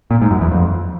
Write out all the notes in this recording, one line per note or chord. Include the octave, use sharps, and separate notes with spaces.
A#2
G#2
F#2
E2
F2